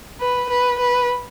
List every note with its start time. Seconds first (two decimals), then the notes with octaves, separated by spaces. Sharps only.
0.20 B4
0.50 B4
0.79 B4